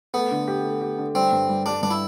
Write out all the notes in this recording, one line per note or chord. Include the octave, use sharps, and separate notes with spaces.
A3 B3
D3
G4
A3
G4
D3
G3 C4
G2
G3
G3 D4
G2 D4
E4